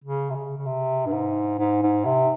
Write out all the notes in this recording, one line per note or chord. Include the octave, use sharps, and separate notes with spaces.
C#3
C3
C#3
C#3
C3
G2
G#2
G#2
G#2
C3